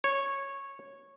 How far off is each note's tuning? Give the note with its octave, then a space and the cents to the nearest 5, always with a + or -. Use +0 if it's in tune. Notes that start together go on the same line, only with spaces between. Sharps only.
C#5 -10